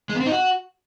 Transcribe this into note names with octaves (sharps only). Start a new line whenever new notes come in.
G#3
B3
C4
D#4
F#4